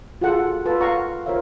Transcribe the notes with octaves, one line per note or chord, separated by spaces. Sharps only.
F4 F#4 G#4 A4 F#5
F4 A4 B4 A5
F5 F#5 A#5 C#6
F4 A#4 C5 C#5 E5 F5